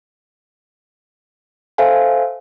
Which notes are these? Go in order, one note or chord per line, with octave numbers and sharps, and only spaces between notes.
A4 C5 E5 F5 G#5